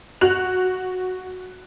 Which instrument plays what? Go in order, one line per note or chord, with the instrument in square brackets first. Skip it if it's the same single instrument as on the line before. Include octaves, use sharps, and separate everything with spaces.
[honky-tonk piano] F#4 F#6 F7